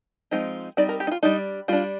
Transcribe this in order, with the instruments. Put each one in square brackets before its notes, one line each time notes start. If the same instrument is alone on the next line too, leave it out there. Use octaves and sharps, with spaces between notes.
[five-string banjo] F3 G#3 C4 D#4
G3 C4 D#4 D5
A#4
G4
D#4
F4
G3 D4 D#4
G3 D4 F4